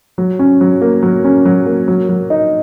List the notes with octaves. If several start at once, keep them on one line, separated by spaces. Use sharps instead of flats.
F#3
C#4
F#3
A#3
F#3
C#4
F#3
A#3
F#3
F#3
D#4